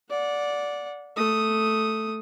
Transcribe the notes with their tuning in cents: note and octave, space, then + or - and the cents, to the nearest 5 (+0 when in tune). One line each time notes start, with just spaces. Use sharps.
D5 -10 F#5 -25
A3 +0 D#6 +0